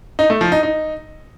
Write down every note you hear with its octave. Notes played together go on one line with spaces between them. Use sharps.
D#4
A3
F3
D#4
D#4